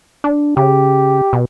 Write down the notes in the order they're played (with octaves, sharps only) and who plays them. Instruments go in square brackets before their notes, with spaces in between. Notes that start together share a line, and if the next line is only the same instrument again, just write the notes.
[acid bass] D4
[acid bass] C#3 [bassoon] G4
[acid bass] B2